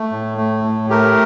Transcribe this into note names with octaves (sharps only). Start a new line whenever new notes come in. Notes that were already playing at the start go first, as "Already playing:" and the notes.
Already playing: A3
A2
A3
A2
A3 G4 A#4